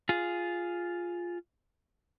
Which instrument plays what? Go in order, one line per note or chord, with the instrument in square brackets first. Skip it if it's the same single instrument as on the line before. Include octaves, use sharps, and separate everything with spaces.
[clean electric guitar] F4 G#4